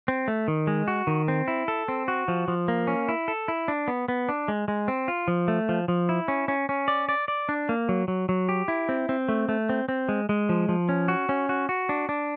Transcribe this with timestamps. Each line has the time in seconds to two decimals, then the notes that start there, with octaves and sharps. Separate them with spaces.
0.08 C4
0.28 A3
0.48 D#3
0.67 G#3
0.88 F#4
1.07 D#3
1.28 C4
1.48 E4
1.68 A4
1.88 C4
2.08 F#4
2.28 F3
2.48 F3
2.68 A#3
2.87 C#4
3.09 E4
3.28 A4
3.48 E4
3.68 D4
3.88 B3
4.08 B3
4.29 D4
4.48 G#3
4.68 G#3
4.88 C4
5.08 F4
5.28 F3
5.48 A3
5.69 F3
5.88 F3
6.09 E4
6.28 C#4
6.48 C#4
6.69 C#4
6.88 D5
7.09 D5
7.28 D5
7.49 D4
7.69 A#3
7.89 F#3
8.08 F#3
8.29 F#3
8.49 G4
8.68 E4
8.89 C4
9.09 C4
9.29 A3
9.49 A3
9.69 C4
9.89 C4
10.09 G#3
10.29 G#3
10.49 F3
10.69 F3
10.89 C#4
11.08 F#4
11.29 C#4
11.49 F#4
11.69 F#4
11.89 D4
12.09 D4